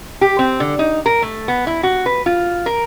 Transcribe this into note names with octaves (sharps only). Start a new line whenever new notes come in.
G4
C4
D3
D#4
A#4
A3
B3
E4
F#4
B4
F4
A#4